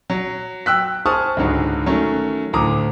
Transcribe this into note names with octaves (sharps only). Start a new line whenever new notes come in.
F#3
G5 E6 F#6 B6
G#4 C5 A5 C#6 D#6 F6
C#2 G#2 D3 F#3
D#3 F#3 A3 C#4
D2 A2 A#5 D6 D#6